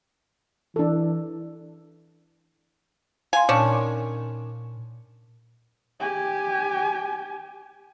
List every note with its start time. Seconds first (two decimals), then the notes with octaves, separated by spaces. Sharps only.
0.76 E3 D4 A4
3.33 F5 G#5 C6
3.49 A#2 D#3 C#4 D4
6.00 G4 G#5